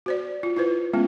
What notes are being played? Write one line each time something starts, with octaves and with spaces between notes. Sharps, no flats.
F#4 C5 D5
F4
E4 F4 B4 C5
G#3 A3 B3 C#4 F4